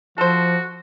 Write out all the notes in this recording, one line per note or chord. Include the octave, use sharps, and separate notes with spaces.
F3 F#4 A4 C5